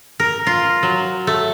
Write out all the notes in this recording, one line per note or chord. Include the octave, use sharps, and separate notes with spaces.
A#4
F4
F#3
A3